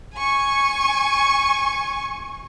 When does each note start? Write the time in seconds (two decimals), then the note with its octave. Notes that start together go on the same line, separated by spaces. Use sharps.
0.15 G#5 C#6